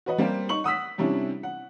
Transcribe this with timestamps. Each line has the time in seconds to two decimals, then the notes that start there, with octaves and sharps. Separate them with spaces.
0.06 F#4 B4 D#5 F#5
0.18 G3 A#3 C4 G4
0.49 D#4 C#6 F#7
0.64 F#5 D#6 E6 B6
0.98 C3 G3 C#4 D4 E4
1.43 F#5